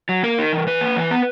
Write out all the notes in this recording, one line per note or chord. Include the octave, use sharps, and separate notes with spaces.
F#3
A#3 A#4
D#4
E3
E3 B4
A#3
E3
B3